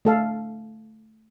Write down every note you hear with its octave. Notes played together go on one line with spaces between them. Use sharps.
A3 A4 F5